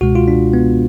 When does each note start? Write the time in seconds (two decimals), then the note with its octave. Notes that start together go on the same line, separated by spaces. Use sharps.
0.01 C#2 B2 G#3 F#4
0.15 F4
0.28 D4
0.53 B3